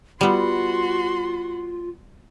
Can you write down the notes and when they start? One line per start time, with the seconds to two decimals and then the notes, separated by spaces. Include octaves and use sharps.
0.21 G3 B3 F4 F#4 C6